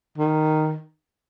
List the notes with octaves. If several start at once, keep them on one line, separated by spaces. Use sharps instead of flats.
D#3